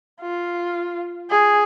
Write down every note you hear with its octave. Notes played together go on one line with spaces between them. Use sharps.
F4
G#4